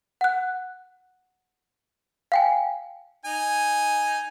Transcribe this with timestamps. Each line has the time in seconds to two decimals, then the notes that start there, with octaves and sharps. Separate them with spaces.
0.21 F#5 F#6
2.32 F5 G5 G#5
3.25 D#4 G#5